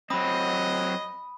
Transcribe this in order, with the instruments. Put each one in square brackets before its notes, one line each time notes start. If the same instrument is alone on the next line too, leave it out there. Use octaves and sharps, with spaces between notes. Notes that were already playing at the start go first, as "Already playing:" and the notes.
[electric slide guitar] F#3 C4 [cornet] D#5 [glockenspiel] B5 D#6